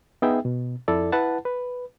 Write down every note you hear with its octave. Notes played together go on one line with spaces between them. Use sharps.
B3 D#4 G#4 E5 G5
B2
F2 E4 A4 D5
E4 B4 F#5 A5
B4